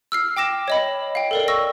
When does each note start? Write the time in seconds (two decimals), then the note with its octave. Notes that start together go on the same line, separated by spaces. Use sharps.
0.12 E6 F6 C7
0.37 G5 D6 A#6 E7
0.68 C#5 D#5 B5
1.15 F5 G5
1.31 A4 A#4 D5
1.48 C#6 E6 A#6